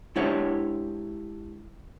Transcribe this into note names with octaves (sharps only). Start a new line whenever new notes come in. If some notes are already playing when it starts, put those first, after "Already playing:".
G#3 D4 E4 G4 C#5 F#5